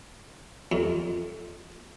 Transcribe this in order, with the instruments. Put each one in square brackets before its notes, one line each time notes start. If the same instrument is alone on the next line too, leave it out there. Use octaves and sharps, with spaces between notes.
[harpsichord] F2